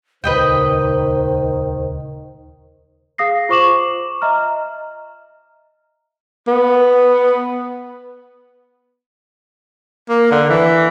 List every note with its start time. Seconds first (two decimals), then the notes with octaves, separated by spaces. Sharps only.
0.24 D#1 C#2 D#3 B4 C5 D#5 G5
3.18 G#4 F5 D#6 A#6 C7
3.49 F4 C5 C#6 D6 E7 F#7
4.22 D#5 E5 A#5 F6
6.47 B3
10.09 A#3
10.31 D3
10.49 E3